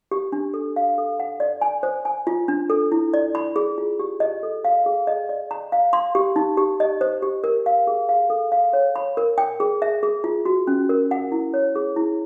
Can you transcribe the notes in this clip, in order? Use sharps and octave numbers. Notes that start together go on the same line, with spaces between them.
G4
D4
A4
F5
A4
F#5
D5
G#5
C5
G#5
F4
D4
A4
E4
D5
B5
G#4
F4
G4
D#5
A4
F5
G#4
D#5
D5
A#5
F5
C6
G4
D#4
G4
D#5
C5
G4
A#4
F5
G#4
F5
A4
F5
C#5
B5
A#4
G5
G#4
E5
G#4
F4
F#4
C#4
A#4
F#5
E4
C#5
G#4
E4